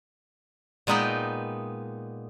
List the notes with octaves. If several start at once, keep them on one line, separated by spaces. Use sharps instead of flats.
A#2 G#3 B3 D#4 B4 G5